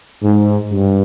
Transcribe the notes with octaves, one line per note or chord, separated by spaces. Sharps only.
G#2
G2